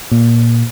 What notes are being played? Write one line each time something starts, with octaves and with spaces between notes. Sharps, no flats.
A#2